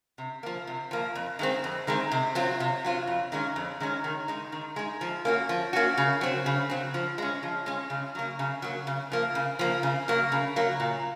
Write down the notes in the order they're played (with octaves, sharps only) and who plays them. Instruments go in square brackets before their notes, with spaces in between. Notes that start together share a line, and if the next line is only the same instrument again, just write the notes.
[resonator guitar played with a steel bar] C3
F3 A#3
C3
F3 A#3
F2
D#3 G#3 C4
F2
D#3 G#3 C4
C3
F#3 C4 F4
C3
F#3 C4 F4
F2
D#3 G#3 C#4
F2
D#3 G#3 C#4
D#3
G#3 D#4
D#3
G#3 D#4
F3
A#3 C#4 F#4
F3
A#3 C#4 F#4
C#3
F#3 C4
C#3
F#3 C4
F3
G#3 C#4
F3
G#3 C#4
C#3
F#3 A#3
C#3
F#3 A#3
C#3
F3 A#3
C#3
F3 A#3
C#3
F#3 A#3
C#3
F#3 A#3
A#2